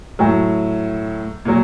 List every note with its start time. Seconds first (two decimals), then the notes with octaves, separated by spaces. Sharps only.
0.19 A2 F#3
1.45 A#2 F#3